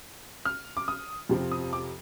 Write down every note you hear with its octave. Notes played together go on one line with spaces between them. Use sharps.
F6
D6
D#6
F2 C3 F3 C4
D#6
D6